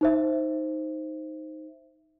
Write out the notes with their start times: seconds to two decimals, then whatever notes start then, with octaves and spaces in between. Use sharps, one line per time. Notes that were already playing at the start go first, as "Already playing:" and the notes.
0.01 D#4 C5 E5